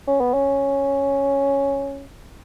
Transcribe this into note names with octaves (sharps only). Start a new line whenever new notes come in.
C#4
B3
C#4